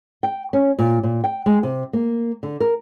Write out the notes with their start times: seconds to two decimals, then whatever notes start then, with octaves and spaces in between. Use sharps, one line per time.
0.23 G5
0.53 C#4
0.79 A#2
1.03 A#2
1.24 G5
1.46 G#3
1.63 C3
1.93 A#3
2.43 D3
2.60 A#4